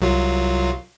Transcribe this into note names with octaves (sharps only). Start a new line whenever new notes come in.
C2 F#3 F4